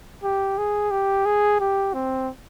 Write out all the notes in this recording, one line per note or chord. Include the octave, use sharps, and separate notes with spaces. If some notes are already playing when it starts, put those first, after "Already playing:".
G4
G#4
G4
G#4
G4
C4